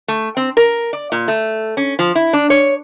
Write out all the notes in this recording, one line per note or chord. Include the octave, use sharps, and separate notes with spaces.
A3
C4
A#4
D5
A#2
A3
C#4
F3
E4
D4
C#5